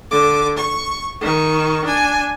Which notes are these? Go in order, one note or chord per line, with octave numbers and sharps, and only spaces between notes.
D3 D6
C#6
D#3 C#6
D4 G#5